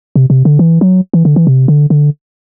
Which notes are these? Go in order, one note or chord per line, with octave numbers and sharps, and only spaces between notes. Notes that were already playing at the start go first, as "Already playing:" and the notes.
C3
C3
D3
E3
F#3
E3
D3
E3
C3
D3
D3